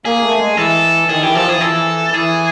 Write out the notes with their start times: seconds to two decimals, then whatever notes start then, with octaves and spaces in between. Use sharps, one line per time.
0.05 A#3 G#4
0.23 A3
0.40 G#3
0.57 E3 A4
1.09 D#3 G#4
1.23 E3 G4
1.35 F3 A4
1.48 E3 G#4
1.61 E3 A4
2.14 E3 G#4